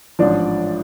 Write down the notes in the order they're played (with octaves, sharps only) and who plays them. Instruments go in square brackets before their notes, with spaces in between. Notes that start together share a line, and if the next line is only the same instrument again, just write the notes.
[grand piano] A1 G#2 F3 D4 D5